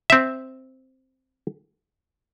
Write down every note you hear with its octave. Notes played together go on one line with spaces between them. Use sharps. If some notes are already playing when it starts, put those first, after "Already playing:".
C4 E5